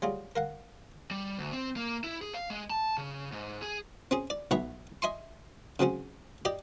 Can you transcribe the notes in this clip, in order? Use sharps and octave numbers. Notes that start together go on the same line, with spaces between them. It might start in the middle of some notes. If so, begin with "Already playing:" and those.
F#3 G3 F4 G#4
A#4 F5 F#5
G3
D2
C4
A#3
E4
G#4
F5
G#3
A5
C#3
G#2
G#4
C4 C#4 G#4
D5
B1 B2 C#5 E5 F#5 B5
D#5 E5 G#5 C6 C#6
C#3 F#3 C4 C#4
G4 D5 D#5 G5